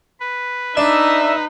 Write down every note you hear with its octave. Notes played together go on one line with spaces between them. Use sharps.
B4
D4 D#4 E5